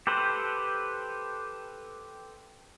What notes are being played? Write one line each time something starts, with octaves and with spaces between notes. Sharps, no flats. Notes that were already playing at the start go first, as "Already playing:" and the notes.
G4 A4 B4 C5